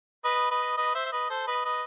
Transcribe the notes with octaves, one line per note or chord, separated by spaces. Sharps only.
B4 D#5
B4 D#5
B4 D#5
C5 E5
E5
B4 D#5
A4 C5
B4 D#5
B4 D#5